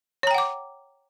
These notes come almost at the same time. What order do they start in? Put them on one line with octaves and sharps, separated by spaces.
C#5 A#5 G5 F#5 D6